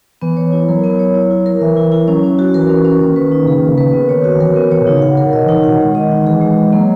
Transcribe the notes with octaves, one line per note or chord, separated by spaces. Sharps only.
E3 B3
C#5
E4
F#3 A#4
B3
C#5
E4
E4
A#4
E3 E5
E4
E4
F#3 C#4
C#4
F#4
E3 A#4
C#4
C#4
D#3 A#3
B4
D#4
C#3 G#4
D#3
A#3
C#3
B4
D#3 B3
C#5
F#4
E3 A#4
E3 B3
D#3 C#5
B2
C#3 D#4
F#5
A#4
C#3
B2 D#5
E3 D#4
D#3
B2 F#5
D#3 G#3
D#5
D#4
E3 G#4
G#3
D#5
F#3 A#3